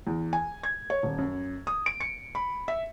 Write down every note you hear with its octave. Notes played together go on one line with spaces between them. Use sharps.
E2
G#5
G#6
C#5
D#1
F#2
D#6
D7
C#7
B5
E5